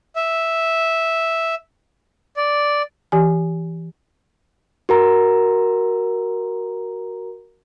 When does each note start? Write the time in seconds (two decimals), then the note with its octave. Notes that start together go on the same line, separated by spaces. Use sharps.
0.16 E5
2.37 D5
3.12 E3 G4 G#5
4.89 F#4 A#4 A#5